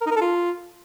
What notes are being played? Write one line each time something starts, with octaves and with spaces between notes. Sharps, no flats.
A#4
D#4
A#4
A4
F4